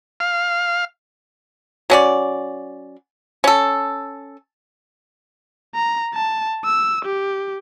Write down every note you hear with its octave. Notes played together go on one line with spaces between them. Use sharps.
F5
F#3 C#4 D5
C#4 A4
A#5
A5
E6
G4